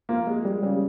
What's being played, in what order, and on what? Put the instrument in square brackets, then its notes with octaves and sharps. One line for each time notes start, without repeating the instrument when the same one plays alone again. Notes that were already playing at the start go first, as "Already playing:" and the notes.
[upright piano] A#3 [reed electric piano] F4
[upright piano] G#3 [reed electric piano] A#3
[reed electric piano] G3 [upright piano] G#3
[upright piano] C#3 [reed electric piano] G3